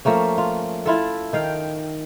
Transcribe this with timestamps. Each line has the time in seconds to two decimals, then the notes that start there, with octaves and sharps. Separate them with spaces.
0.05 F3 A3 A#3 C#4
0.38 F4
0.86 E4 F4 A4
1.33 D#3 F5 G5